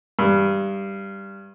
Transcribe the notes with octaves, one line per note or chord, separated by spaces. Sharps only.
G2